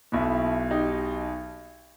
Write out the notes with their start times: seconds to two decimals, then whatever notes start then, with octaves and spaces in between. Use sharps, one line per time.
0.12 B1 B2 E4
0.71 D#4 G4